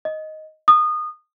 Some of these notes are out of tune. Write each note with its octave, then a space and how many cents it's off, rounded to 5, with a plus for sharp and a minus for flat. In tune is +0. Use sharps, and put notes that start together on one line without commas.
D#5 +5
D#6 -25